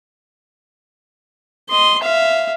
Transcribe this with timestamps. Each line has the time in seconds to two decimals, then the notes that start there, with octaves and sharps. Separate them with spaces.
1.69 D#5 C6
2.01 E5 F5